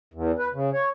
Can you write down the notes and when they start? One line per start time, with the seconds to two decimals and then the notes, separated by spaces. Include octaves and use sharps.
0.14 E2
0.39 B4
0.54 C#3
0.73 C#5